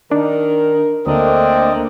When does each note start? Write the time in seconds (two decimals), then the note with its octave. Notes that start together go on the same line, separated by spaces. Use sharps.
0.11 D#3 D4 A#4
1.07 D2 D3 A3 A#3 C4 D4 A#4 D#5